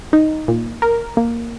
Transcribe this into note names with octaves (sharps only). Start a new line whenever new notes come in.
D#4
A#2
A#4
A#3